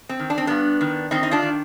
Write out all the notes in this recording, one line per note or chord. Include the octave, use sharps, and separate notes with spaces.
C4
D#3
D4
C4
G2 B3 D4
D#3
D#3 C4 D#4
D#4
D4 F4
D#3